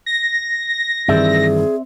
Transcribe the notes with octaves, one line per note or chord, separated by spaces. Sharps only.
A#6
G2 D#3 E3 C4 G#4 D5 E5